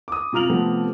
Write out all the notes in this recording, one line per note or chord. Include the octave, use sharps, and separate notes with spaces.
D6 D#6
C3 F4 A#5 F6 F7 F#7
C3 F3 A3 B3 C4